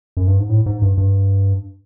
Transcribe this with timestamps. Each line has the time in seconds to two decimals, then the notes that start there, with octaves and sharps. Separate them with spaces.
0.17 F#2
0.28 G2
0.39 G#2
0.50 A2
0.66 G#2
0.82 G2
0.97 G2